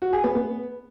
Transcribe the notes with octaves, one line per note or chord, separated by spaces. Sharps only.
F#4
G#4
B3
B3